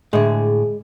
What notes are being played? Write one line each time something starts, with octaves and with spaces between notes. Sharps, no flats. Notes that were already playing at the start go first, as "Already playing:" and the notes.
A2 D3 G#3